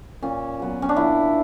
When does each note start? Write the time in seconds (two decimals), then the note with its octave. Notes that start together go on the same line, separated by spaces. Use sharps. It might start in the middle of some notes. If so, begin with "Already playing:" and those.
0.22 A#2 C#4
0.60 F#3 B3
0.82 C#4
0.89 D4
0.96 A#2 E4